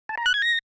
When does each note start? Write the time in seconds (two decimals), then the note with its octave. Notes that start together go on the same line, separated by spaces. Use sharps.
0.09 A5
0.17 A#5
0.26 F#6
0.34 G#6
0.42 A#6